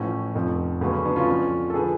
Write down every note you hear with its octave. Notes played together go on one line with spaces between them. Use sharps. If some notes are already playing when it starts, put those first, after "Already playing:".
Already playing: A1 A2 F3 C#4
F1 F2 F3
D2 C#3 F#3 B3
C#4
B3 D4
C#4 F4
F2 D3 F3
A4
D3 F3 G#4 B4